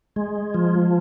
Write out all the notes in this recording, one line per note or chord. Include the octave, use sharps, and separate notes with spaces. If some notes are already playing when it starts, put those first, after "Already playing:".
G#3
F3